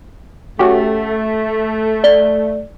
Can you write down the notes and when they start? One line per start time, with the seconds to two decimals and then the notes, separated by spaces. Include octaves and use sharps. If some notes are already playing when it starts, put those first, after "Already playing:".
0.59 A3 C#4 F#4 G4
2.04 D5 G7